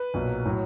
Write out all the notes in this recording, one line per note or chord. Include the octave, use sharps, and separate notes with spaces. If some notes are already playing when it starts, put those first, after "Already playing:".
Already playing: B4
B1 A#2 F#3
A2 F#3